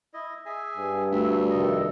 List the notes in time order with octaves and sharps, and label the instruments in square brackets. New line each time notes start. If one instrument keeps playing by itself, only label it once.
[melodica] E4 D#5
G#4 E5 G#5
[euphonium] G2
[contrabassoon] D2 [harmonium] A3 [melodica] C4 E5
[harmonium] F2 C3 D#3 [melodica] A4 D#5